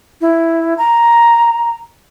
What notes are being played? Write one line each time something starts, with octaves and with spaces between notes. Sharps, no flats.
E4
A#5